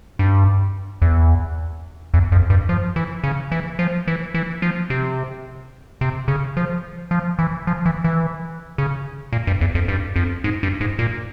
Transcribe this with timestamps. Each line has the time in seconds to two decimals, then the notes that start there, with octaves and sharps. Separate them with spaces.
0.19 G2
1.02 E2
2.14 E2
2.32 F2
2.50 G2
2.69 F3
2.96 E3
3.24 C#3
3.52 E3
3.79 F3
4.07 E3
4.34 E3
4.62 F3
4.90 C3
6.01 C3
6.28 C#3
6.57 F3
7.11 F3
7.39 E3
7.67 F3
7.86 E3
8.04 E3
8.78 C#3
9.33 A#2
9.47 G2
9.61 E2
9.75 F2
9.88 G2
10.16 F2
10.44 G#2
10.63 G2
10.81 G#2
10.99 A#2